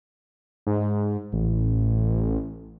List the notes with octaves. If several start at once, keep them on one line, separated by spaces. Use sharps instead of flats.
G#2
A1